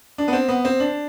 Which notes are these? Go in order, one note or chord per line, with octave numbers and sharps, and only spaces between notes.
D4
B3
C4
B3
C4
D4